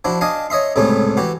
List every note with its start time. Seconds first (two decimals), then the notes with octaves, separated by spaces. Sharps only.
0.05 F3 D4 E4 F#4
0.21 D4 D#5 F5 G#5 A5
0.50 C#5 D#5 E5 C6
0.76 C#2 A2 C3 G3 A3 G#4
1.17 E3 F#4 G4